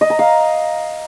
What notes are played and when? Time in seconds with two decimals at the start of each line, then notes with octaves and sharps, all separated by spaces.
0.01 D#5
0.10 A#5
0.19 F5